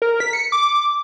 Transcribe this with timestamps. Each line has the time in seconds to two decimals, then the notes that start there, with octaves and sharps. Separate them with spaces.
0.02 A#4
0.20 B6
0.33 C#7
0.52 D6